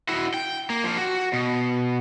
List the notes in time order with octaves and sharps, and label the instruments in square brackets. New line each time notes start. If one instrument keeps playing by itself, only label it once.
[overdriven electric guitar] E4 F#4
G5
A#3
F3 A#3
F#4
B2